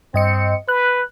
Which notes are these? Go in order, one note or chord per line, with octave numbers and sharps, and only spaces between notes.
G2 C4 D#5 C#7
B4 F#6